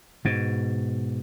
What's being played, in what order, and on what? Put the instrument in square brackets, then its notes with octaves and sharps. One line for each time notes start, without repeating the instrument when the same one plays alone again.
[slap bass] G#2 B2